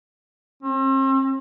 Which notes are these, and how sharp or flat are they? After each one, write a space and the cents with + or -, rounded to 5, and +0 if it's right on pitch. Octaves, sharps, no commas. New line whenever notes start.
C4 +40